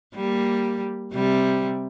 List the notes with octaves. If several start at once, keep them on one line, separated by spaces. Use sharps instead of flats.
G3 A#3
C3 G3